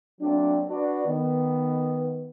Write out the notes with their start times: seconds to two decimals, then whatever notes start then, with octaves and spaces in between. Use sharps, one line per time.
0.21 F#3 A3 A#3 C4 D4
0.69 D4 F#4 B4 D5
1.07 D#3 B3